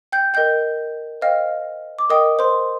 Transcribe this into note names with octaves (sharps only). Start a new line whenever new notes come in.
G5 G6
A#4 D#5 G5 G6
C5 D#5 F5 G5 F6
D6
A#4 D#5 G5 D#6
C5 C6